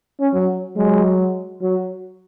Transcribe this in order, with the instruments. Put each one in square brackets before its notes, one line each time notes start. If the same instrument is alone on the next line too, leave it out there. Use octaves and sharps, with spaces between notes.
[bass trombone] C#4
[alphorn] F#3
[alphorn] F#3 [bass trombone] G#3
[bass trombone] F#3